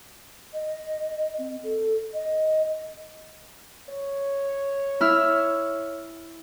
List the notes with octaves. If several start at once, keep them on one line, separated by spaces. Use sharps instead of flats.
D#5
C4
A4
D#5
C#5
E4 E6 F6